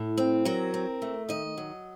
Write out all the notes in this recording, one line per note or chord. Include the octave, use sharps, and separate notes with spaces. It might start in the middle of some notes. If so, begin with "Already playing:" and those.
Already playing: A2
C4
F#3 A#4
C4
A3
D#3 D#5
F#3